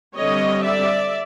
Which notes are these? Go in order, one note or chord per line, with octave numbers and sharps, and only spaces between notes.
D3 G3 C4 C#5 D#5
D5 E5